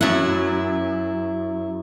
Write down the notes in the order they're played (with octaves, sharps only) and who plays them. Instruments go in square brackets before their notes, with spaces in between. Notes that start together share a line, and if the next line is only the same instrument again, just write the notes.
[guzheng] F#2 F#5 [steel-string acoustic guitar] E4